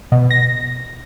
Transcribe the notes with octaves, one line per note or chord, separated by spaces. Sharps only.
B2
A#6